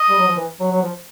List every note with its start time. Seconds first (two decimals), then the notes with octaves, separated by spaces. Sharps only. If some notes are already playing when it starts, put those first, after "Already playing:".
Already playing: D#5
0.09 G3
0.19 F#3
0.27 F3
0.37 E3
0.60 F#3
0.71 F#3
0.82 F3